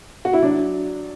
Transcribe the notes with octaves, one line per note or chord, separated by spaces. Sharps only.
F#4
E4
F#3 D4